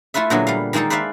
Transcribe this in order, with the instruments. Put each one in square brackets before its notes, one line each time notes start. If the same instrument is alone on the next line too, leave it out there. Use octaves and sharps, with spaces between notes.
[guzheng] A3 E4 F4 B4 E5
A#2 D3 F#3 G#3 B3 E4
G3 F5
D#3 G#3 A#3 D#4 A4
B4 C5 D5 E5 F5